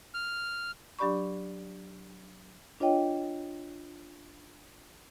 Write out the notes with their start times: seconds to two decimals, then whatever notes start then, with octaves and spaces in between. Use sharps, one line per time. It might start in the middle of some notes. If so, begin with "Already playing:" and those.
0.14 F6
0.99 F#3 D4 G4 D5 B5 C#6
2.80 D4 F4 C#5 D#5 G5